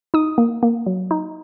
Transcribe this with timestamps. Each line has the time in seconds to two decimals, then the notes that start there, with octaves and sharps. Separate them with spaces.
0.14 D#4 D#6
0.38 A#3
0.63 A#3
0.86 F#3
1.11 D#4